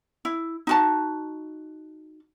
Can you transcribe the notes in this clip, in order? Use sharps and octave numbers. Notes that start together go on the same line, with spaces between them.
E4
D#4 F#4 A5